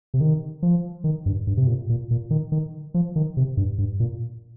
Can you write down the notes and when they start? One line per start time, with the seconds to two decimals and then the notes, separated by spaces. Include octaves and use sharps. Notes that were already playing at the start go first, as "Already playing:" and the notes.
0.14 C3
0.21 D#3
0.63 F3
1.04 D#3
1.26 G2
1.47 G2
1.57 C3
1.67 A#2
1.89 A#2
2.11 A#2
2.30 D#3
2.52 D#3
2.94 F3
3.16 D#3
3.37 C3
3.57 G2
3.78 G2
4.00 A#2